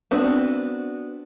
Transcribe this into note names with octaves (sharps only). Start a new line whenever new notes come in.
B3 C4 D4 F#4